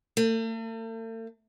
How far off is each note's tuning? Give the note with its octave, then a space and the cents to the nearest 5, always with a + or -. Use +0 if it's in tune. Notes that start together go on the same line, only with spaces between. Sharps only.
A3 +45